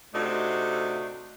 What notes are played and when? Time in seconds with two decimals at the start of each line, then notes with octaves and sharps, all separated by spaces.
0.14 C3 A3 D4 D#4 F#4 A4